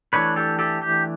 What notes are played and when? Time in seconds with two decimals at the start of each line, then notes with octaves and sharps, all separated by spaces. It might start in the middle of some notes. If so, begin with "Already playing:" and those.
0.13 E3 A3 D4 B4 C#5
0.36 G4 A4
0.59 G4 A4
0.82 G4